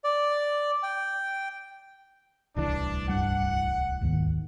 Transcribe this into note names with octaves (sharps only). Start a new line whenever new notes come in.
D5
G5
D1 C2 E3 D4
G2 G3 F#5
D#2 G#2 D#3